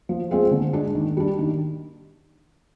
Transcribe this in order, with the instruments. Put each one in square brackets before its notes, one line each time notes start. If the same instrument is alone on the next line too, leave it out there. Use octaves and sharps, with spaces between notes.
[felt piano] F3
G#3 C4 F4 G#4
D3
G#3 D4 G#4
D#3
G3 D4
D#3